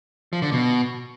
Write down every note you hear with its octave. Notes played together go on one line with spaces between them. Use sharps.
F3
D3
B2